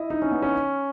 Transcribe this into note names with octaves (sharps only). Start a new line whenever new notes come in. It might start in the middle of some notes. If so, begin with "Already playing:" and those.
Already playing: E4 D#5
D#4
C#4
B3
C#4